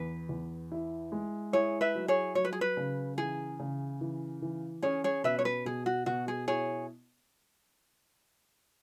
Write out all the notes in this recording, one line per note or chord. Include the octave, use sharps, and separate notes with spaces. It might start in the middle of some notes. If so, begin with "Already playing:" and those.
Already playing: E2 B4
E2
E4
G#3
E4 G#4 C#5
B4 E5
F#3
G#4 C#5
F#3 C#5
B4
G#4
B4
C#3
E3 G#4
C#3
E3
E3
C#4 G#4 C#5
G#4 C#5
B2 B4 E5
C#5
B4
B2 G#4
F#4
B2 F#4
G#4
E4 G#4 C#5